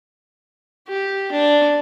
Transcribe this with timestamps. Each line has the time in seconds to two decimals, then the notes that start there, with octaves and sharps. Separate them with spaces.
0.88 G4
1.32 D4